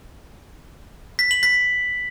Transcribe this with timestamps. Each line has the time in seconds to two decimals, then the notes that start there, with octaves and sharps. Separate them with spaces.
1.19 B6
1.31 F#7
1.43 B6